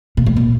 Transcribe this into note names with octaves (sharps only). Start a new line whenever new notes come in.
A#2
A2
A#2